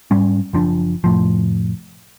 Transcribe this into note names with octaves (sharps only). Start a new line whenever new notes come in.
G#2 G3 C#4
F#1 F3 D4
F1 A2 F3